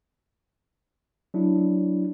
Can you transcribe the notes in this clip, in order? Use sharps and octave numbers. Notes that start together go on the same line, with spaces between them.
F#3 D4 E4